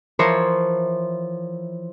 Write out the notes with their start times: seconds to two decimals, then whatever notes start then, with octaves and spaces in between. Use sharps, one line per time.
0.19 E3 F3 A#4 C5 C#5